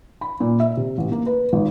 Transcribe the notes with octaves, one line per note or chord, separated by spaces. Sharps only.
B5
A#2
E5
C3
A1
A#3
B4
G#1